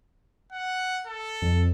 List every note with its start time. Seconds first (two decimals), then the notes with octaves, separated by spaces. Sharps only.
0.52 F#5
1.07 A4
1.42 F2